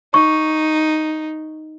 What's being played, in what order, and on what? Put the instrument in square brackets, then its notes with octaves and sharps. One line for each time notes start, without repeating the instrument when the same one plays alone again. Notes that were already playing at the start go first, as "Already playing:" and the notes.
[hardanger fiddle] D#4 [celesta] C#6